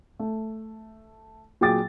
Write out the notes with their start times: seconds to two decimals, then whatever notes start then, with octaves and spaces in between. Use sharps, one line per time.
0.19 A3
1.61 A#2 F#3 G#4 G5 D6 A6